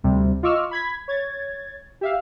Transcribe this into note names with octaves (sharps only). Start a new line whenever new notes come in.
D2 C3 G3
F4 D#5 C#6 D6 E6 F6
B5 G#6 B6
C#5 G#6 A6
G4 E5 F5